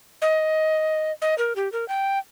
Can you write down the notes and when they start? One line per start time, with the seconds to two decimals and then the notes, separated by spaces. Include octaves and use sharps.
0.22 D#5
1.22 D#5
1.38 A#4
1.56 G4
1.72 A#4
1.88 G5